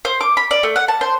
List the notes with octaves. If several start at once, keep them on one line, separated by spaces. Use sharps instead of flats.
C5
D6
B5
D5
A3
F#5
A5
C5